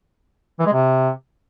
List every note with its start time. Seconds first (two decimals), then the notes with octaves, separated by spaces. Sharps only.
0.59 E3
0.66 G#3
0.73 C3